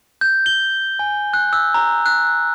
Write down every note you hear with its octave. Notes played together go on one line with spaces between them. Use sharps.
G6
G7
G#5
F#6
E6
A#5
F#6